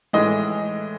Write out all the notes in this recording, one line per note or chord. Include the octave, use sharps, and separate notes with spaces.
A2 E3 G#3 D#5